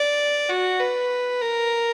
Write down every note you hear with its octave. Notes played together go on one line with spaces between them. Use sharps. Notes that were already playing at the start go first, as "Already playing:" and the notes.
Already playing: D5
F#4
B4
A#4